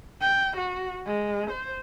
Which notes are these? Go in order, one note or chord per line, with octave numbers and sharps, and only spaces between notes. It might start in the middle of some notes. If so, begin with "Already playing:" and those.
G5
F#4
G#3
C5